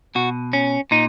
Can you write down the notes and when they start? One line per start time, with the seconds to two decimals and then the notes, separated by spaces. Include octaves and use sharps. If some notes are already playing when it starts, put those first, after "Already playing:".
0.15 B2 F#4
0.53 C#4
0.91 A#2 D#4